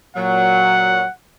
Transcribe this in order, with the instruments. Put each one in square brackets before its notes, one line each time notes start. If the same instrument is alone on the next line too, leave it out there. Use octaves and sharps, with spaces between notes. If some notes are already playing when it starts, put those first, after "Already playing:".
[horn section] A#2 F#3 [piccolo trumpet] F#5